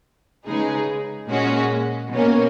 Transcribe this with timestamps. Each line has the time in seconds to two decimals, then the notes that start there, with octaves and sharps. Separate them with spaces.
0.46 C#3 G#3 D#4 G#4 B4
1.30 A#2 G#3 C#4 F#4
2.13 B2 A#3 C#4